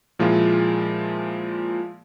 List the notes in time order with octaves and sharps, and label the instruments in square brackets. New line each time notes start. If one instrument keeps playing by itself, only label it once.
[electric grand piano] A#2 F3 G#3 E4 F4